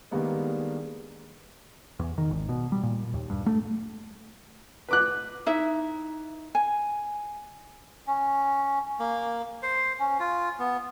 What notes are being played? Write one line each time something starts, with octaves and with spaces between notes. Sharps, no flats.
D#3 G3 G#3 A#3 B3 D4
E2
D#3
G#1
B2
G3
A#2
D#2
G2
A3
B4 D6 F#6
D#4 E4 E5
G#5
C#4
A#3
C5
C#4
F4
B3